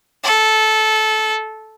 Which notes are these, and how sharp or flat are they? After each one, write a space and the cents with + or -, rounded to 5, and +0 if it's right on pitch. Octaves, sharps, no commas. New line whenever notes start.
A4 -15